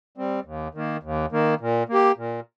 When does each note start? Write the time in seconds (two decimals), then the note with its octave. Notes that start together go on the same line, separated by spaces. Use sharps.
0.17 G3 C4
0.45 D#2
0.75 D#3 A#3
1.03 D#2
1.32 D#3 A#3
1.60 A#2
1.89 A#3 G4
2.17 A#2